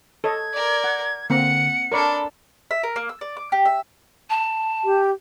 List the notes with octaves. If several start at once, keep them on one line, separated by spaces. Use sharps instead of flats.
A4 C#5 D#5 G#6
A#4 D5
F#5
D3 A#3 C4 F#5 A#5 C#7
D4 A4 A#4 C#5 D5 A#5 B5 D6
E5
A#4
A#3
E6
D5
D6
G4
E5
A5
G4